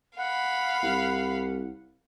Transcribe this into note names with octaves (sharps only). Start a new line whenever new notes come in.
F5 F#5 B5
C2